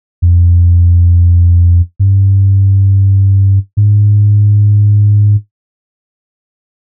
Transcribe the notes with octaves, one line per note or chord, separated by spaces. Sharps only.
F2
G2
G#2